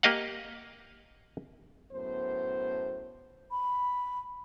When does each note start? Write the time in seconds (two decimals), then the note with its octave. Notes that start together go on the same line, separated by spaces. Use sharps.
0.03 A#3 G4 D#5 F5 F#5
1.92 F#2 A2 B3 C5
3.51 B5